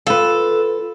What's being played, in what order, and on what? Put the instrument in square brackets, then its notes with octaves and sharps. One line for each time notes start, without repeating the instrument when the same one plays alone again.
[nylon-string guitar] F4 B4 [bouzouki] A4